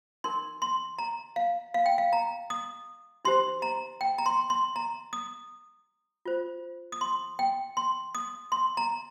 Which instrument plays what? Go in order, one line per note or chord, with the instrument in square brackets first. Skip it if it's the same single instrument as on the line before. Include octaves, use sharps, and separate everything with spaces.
[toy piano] D#4 A#4 C6
C6
A#5
F5
F5
G5
F5
A#5
D#6
D#4 G4 C5 C6
A#5
G5
A#5
C6
C6
A#5
D#6
F4 C5
D#6
C6
G5
C6
D#6
C6
A#5